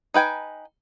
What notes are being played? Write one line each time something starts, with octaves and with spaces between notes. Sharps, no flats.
D#4 B4 G5 G#5